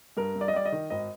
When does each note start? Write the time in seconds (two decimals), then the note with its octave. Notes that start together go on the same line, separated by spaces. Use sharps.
0.17 G2 A#4
0.36 G2
0.41 D5
0.48 D#5
0.53 G3 D5
0.66 D#5
0.72 D#3
0.90 G#1 D#5